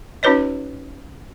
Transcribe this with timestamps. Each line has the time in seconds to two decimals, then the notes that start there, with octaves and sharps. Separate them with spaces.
0.23 C#4 D#4 F#4 B4 C#5 D#5